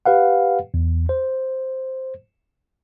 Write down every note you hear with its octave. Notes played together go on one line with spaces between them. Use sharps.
G4 B4 F5 F#5
E2
C5